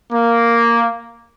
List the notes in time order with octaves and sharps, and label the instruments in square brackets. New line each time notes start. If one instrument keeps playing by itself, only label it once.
[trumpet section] A#3